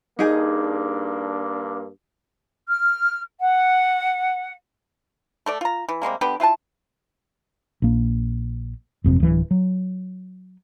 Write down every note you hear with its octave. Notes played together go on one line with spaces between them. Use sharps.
G2 A#3 D4 D#4 G#4
F6
F#5
A3 A4 D5
F4 A#5
E3
C3 G3 G#3 A#3
D3 B3 G4
E4 F4 F#5 A5
A#1 A#3
F#1 F2 C3
D1 E3
F#3